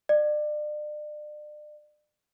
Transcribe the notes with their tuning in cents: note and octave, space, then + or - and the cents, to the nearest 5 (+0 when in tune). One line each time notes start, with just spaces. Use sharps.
D5 +35